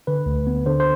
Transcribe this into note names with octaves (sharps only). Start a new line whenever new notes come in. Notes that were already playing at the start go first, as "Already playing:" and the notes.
D3 B4
D2
B3
D3 C5
C5